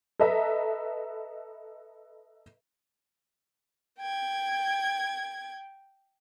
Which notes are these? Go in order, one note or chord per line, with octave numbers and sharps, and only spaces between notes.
A4 B4 D#5 E5 A#5
G5 G#6